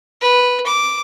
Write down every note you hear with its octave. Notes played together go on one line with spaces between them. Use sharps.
B4
D6